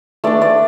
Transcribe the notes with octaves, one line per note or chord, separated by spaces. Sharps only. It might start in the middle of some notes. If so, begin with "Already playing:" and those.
A3 D4 D5
D5